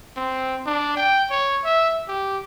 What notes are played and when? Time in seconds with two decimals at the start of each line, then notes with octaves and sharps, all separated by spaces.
0.17 C4
0.67 D4
0.97 G5
1.31 C#5
1.65 E5
2.09 G4